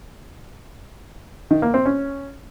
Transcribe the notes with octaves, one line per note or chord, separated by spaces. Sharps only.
D#3
A#3
C4
C#4